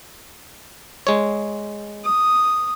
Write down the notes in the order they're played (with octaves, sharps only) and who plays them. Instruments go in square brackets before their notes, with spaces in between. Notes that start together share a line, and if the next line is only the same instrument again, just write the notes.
[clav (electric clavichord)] G#3 C#5
[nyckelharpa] D#6